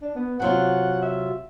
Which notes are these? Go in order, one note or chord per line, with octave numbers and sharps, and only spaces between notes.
D4
B3
C3 F#3 F4 F#5
E5